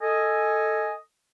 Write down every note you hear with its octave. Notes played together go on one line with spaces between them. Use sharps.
A4 D#5 G#5